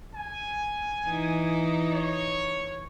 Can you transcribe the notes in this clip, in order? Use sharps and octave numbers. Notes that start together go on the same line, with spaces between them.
G#5
E3 D#4
C#5